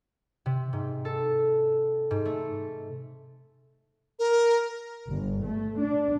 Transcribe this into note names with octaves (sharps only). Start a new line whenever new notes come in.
C3
G#2
A4
G#2
A3
A#4
G1
A3
D4